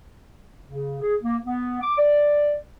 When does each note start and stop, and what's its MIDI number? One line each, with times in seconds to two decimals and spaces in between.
0.68 0.96 49
1.01 1.15 68
1.22 1.37 58
1.45 1.79 59
1.81 1.94 86
1.97 2.56 74